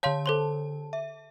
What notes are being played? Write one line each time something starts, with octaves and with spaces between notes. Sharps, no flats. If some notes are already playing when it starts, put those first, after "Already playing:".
D3 C#5 F5 A5 C6
A4 C5 C6
E5